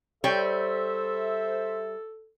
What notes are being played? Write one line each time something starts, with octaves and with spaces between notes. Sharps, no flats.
G3 A4 C5 C#5 E5 G5